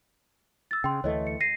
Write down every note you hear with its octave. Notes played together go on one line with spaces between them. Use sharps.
E6 A6
C#3 G5 C6
D2 E3 A3 C#5 D#5
C#7
A#6 C7 D#7